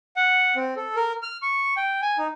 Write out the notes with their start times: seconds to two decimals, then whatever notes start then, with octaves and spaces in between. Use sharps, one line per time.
0.16 F#5
0.55 C4
0.76 A4
0.96 A#4
1.22 F6
1.42 C#6
1.77 G5
2.02 G#5
2.18 D#4